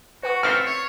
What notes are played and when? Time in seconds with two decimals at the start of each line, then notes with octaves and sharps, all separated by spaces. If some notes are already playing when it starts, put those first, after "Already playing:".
0.23 F#4 B4 F#5 C#6
0.43 A1 C4 E5 F6 A6 C7 C#7
0.66 C#5